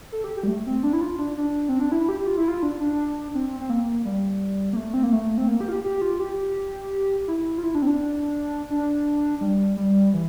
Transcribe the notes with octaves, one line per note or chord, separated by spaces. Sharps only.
A4
G4
G4
G3
A3
C4
D4
E4
F4
D4
D4
C4
D4
E4
G4
F4
E4
F4
D4
D4
C4
C4
A#3
G3
A#3
A3
C4
A#3
A3
C4
A#3
G4
F4
G4
G4
F4
G4
E4
F4
E4
D4
C4
D4
D4
G3
G3
E3